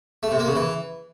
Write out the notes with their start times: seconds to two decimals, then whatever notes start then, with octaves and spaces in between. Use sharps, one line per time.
0.23 A3
0.31 C3
0.39 A#3
0.48 C#3
0.56 E3